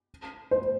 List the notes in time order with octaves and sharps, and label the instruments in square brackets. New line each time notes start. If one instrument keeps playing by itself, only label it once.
[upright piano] C5